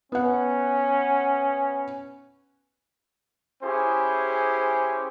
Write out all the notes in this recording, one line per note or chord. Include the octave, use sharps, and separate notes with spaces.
B3 C#4 F#5
C#4 E4 G4 G#4 C5